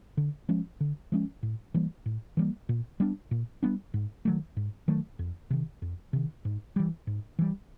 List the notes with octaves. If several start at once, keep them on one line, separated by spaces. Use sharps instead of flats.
D3
F3 G#3 C#4
D3
F3 G#3 C#4
A2
E3 G3 A#3
A2
E3 G3 A#3
A#2
G3 B3 D4
A#2
G3 B3 D4
G#2
D#3 F#3 A3
G#2
D#3 F#3 A3
F2
C3 D#3
F2
C3 D#3
G#2
E3 G3
G#2
E3 G3